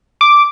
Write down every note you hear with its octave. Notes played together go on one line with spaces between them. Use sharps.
D6